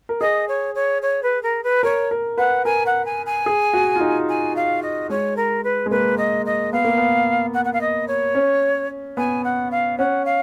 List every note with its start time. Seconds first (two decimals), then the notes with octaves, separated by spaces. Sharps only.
0.09 A#4
0.21 G#4 D#5
0.48 C#5
0.75 C#5
1.02 C#5
1.23 B4
1.43 A#4
1.63 B4
1.83 A#4 C#5
2.11 A#4
2.38 B4 F#5
2.65 A#4 G#5
2.86 F#5
3.05 G#5
3.26 G#5
3.46 G#4
3.74 F#4
3.96 F4
4.01 D#4
4.29 G#5
4.56 F5
4.82 D#5
5.10 G#3 C#5
5.36 A#4
5.64 B4
5.86 G#3
5.91 A#3 B4
6.17 D#5
6.46 D#5
6.73 B3 F5
6.85 A#3
6.98 B3
7.54 F#5
7.65 F#5
7.73 F5
7.81 D#5
8.08 C#5
8.35 C#4
9.17 B3 G#5
9.44 F#5
9.71 F5
9.98 C#4 F#5
10.25 F5